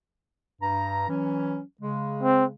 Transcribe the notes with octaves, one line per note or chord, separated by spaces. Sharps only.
G2 A#5
E3 F#3 C#4
C#3 G#3
C4